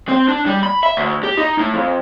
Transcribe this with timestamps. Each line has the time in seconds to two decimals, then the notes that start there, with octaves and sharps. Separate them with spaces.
0.08 C4
0.28 D4
0.46 G3
0.63 B5
0.83 E5
0.97 D2
1.24 G4
1.37 D#4
1.59 A2
1.74 F2